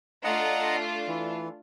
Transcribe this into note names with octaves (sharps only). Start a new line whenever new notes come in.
A3 D4 F4 D#5 F#5 A#5
E3